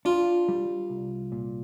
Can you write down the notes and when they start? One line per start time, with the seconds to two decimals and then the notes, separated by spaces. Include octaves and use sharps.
0.05 D4 F4
0.48 G3
0.90 C2
1.32 A#2